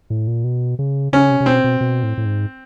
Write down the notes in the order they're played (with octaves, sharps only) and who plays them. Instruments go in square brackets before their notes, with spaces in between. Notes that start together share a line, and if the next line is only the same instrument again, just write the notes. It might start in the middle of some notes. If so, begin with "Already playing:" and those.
[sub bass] A2
A#2
B2
C#3
[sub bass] C#3 [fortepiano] C#4
[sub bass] C3
C3
[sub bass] B2 [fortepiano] C4
[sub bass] B2
B2
A2
A2
G#2